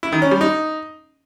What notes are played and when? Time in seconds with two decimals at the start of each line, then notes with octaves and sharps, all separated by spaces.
0.03 E4
0.12 D#3
0.22 C#4
0.31 G3
0.41 D#4